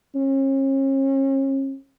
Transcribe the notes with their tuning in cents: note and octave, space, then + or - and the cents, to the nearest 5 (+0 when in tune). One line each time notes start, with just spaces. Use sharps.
C#4 -40